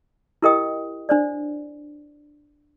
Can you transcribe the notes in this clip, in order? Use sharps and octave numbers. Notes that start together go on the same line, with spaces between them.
E4 G4 A#4 D#5 G5 D#6
D4 C5 D5